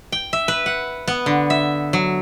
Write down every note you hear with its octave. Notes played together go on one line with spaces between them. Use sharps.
G5
E5
B4
F#5
B3
D3
E5
F#3